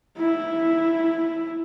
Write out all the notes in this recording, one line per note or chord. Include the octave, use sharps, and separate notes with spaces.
E4